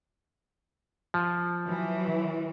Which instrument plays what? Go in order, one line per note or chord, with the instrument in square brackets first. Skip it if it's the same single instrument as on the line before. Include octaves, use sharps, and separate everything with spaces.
[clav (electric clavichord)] F3
[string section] E3 F#3